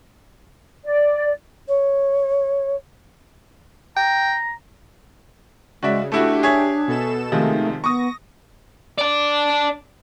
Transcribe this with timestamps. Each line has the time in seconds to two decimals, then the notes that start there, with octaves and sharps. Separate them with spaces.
0.84 D5
1.68 C#5
3.97 G5 A#5
5.83 C#3 G#3 F#4 D5 E5
6.12 A3 D4 E4 F#4 G4
6.43 G#4 C#5 E5
6.87 B2 A4 E7
7.32 C3 D#3 F3 G#3 A3
7.84 B3 C#6 D#6 A#6
8.99 D5 A5